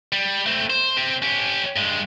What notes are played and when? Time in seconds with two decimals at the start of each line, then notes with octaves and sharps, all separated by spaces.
0.13 G3
0.46 A3 C4
0.70 C5
0.97 C4 G4
1.22 C#4 G4
1.76 G2 G#3